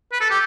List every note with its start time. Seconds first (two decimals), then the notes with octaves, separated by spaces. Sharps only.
0.12 B4
0.21 A4
0.30 G4